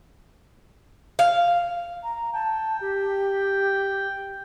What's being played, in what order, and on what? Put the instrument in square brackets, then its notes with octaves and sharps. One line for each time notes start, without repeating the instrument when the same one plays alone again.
[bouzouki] F5
[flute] A#5
[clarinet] G5 [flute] A5
[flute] G4